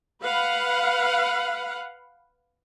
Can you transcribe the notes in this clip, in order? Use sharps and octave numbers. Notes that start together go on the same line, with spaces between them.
B4 F5 F#5